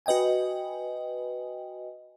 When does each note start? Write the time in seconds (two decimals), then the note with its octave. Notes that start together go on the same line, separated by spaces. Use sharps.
0.06 F#4 B4 D#5 G5 G#5